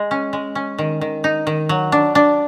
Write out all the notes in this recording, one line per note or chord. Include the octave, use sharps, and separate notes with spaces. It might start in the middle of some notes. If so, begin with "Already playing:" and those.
Already playing: G#3
C#4
G#3
C#4
D#3
D#3
D#4
D#3
F#3
D4
D4